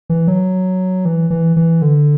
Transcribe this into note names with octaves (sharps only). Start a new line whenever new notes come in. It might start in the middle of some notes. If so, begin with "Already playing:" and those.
E3
F#3
E3
E3
E3
D3